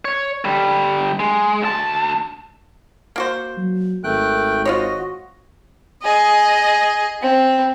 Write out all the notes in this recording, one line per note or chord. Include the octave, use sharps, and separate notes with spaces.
C#5
D3 G3
G#3
D2 A5
A#3 F#4 C5
F#3
G#1 A3 A#4 G5 F#6
F4 F#4 C5 C#5 D#5
G#4 D#5
C4